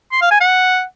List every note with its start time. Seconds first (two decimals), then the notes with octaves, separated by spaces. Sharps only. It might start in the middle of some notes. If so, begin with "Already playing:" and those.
0.12 C6
0.22 F5
0.31 G#5
0.41 F#5